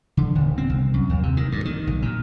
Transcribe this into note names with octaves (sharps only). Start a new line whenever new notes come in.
D3
D#1
C4
C2
F#2
D#2
C3
D#3
G2
D#3
B1
A#2